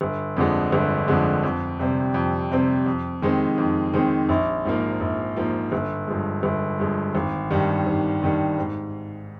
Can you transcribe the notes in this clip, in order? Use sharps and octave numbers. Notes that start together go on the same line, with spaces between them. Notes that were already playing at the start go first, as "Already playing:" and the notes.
G1
F2 D3 F3 G#3
G1
F2 D3 F3 G#3
F2
C3 G3 C4
F2
C3 G3 C4
F2
D#3 G#3 C4
F2
D#3 G#3 C4
A#1
G#2 F3 A#3
A#1
G#2 F3 A#3
G1
G2 F3 G#3
G1
G2 F3 G#3
G#1
G2 D#3 G3
G#1
G2 D#3 G3
G#2